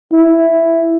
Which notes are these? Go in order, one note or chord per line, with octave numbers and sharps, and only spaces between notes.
E4